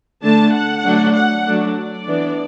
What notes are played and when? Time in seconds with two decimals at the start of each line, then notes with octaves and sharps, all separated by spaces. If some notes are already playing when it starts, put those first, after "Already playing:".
0.23 D3 A3 D4 A5
0.54 F#5
0.85 D3 F#3 A3 D4
1.16 F#5
1.46 F#3 A3 D4
1.77 D5
2.07 E3 B3 D4